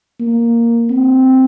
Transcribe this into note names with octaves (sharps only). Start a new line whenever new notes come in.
A#3
C4